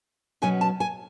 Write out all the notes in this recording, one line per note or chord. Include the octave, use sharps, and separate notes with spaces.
B2 F#3 C#4 G#5
A5
G#5